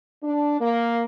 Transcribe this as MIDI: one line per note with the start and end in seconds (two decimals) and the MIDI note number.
0.22 0.57 62
0.60 1.03 58